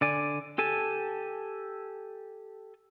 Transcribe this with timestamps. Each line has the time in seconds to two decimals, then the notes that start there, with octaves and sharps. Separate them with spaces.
0.01 D3 D5 G#5
0.58 G4 A4 G#5 A5